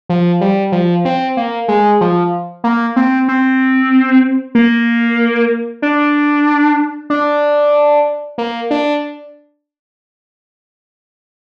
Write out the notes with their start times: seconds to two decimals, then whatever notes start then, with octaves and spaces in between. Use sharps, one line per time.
0.09 F3
0.41 G3
0.72 F3
1.05 C4
1.37 A#3
1.68 G#3
2.01 F3
2.64 A#3
2.96 C4
3.28 C4
4.55 A#3
5.82 D4
7.10 D4
8.38 A#3
8.71 D4